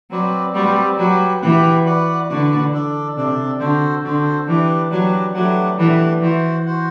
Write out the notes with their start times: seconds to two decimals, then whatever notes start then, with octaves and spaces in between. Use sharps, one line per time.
0.10 F#3 C4 F#4 B4 D5
0.54 G3 C4 F#4 B4 D5
0.98 F#3 G4 B4 F#5
1.42 E3 G4 B4 F#5
1.85 F#4 B4 D5 F#5
2.29 D3 F#4 B4 D5 F#5
2.73 D4 A4 D5
3.16 C3 D4 A4 D5
3.60 D3 F#4 A4 C5
4.04 D3 F#4 A4 C5
4.47 E3 D4 G4 B4
4.91 F#3 D4 G4 B4
5.34 F#3 A3 D4 G4 B4 F#5
5.78 E3 A3 D4 G4 B4 F#5
6.22 E3 F#4 C5 F#5
6.66 F#4 C5 F#5